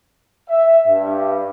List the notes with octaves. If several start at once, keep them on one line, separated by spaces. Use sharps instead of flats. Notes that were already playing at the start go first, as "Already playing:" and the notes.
E5
G2